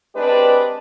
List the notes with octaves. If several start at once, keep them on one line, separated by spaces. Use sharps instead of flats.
G#3 C4 D4 G4 B4 D5